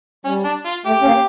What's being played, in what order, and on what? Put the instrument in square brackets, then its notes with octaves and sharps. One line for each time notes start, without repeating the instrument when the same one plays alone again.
[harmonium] G3 [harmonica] C#4
[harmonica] D4
F4
[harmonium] A3 [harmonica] G4
[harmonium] C#4
A#3